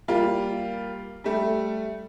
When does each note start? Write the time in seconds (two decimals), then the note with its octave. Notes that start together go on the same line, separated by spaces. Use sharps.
0.08 G3 A#3 F4
1.24 G3 A3